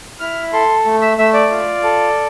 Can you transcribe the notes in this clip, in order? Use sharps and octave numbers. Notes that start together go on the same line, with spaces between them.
E4 F6
A4 C6
A3
E5
A3 E5
D5
F4
A4